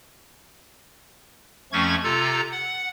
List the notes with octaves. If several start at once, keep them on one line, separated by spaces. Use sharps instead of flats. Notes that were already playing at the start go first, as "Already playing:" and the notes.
F2 F3 A3 C#4 C#6 G#6
C3 F4 A4 A#5
F#5